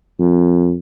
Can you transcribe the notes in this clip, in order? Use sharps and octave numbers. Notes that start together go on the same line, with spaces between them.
F2